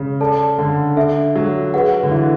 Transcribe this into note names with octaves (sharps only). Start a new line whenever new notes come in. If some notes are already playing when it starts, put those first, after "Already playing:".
Already playing: C#3
A4 D5 A5
D3
D4 A4 E5
F#3
G#4 B4 F#5
D3
E3